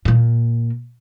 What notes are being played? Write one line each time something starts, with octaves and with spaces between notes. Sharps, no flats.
A#2 A#3